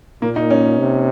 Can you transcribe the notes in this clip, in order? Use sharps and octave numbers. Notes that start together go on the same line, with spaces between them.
A#2 A#3
D#4
C#4
C3